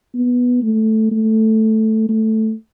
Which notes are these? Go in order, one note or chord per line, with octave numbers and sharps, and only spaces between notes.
B3
A3
A3
A3